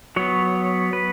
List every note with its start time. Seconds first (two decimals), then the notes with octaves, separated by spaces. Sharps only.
0.16 F#3 B3 C#5
0.93 B4